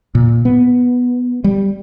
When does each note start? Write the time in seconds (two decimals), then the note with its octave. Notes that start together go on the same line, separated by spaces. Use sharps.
0.15 A#2
0.45 B3
1.44 G3